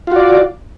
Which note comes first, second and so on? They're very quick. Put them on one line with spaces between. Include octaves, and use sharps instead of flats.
F4 F#4 D5